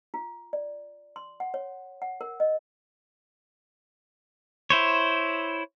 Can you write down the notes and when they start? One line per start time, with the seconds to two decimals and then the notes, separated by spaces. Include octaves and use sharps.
0.14 F4
0.53 D5
1.16 C6
1.40 F#5
1.54 C#5
2.02 F#5
2.21 A#4
2.40 D#5
4.70 E4 C5 C#5